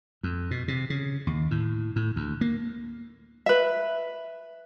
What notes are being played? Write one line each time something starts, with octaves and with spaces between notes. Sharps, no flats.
F2
B2
C3
C#3
D#2
A2
A2
D2
A#3
B4 E5